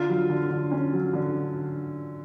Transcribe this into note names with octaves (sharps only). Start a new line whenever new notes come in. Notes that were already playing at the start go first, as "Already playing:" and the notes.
Already playing: D3 F4
F#3
D3
D3
C#4
F#3
D3